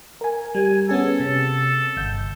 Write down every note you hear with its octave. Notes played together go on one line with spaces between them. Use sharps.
A#4 G#5
G3 G#5
B3 C#4 G#4 A4
C3
G1 G6